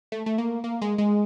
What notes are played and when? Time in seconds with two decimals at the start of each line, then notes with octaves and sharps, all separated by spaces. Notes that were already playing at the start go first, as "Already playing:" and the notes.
0.12 A3
0.26 A3
0.38 A#3
0.64 A#3
0.82 G#3
0.98 G#3